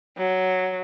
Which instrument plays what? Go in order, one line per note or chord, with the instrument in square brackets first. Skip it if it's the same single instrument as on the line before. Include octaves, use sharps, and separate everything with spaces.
[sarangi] F#3